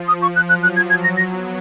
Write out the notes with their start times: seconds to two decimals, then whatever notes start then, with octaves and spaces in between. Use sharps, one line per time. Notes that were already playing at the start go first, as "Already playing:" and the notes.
Already playing: F3
0.08 D#6
0.22 C#6
0.36 F#6
0.49 F#3 F#6
0.63 F#6
0.76 G#6
0.90 G#6
1.04 A#6
1.17 A#6
1.30 B3